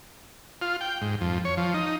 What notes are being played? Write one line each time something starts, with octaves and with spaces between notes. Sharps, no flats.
F4
G5
G#2
F2
C#5
F3
D#4